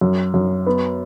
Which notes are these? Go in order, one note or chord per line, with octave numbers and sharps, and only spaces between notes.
F#2
F#2
B3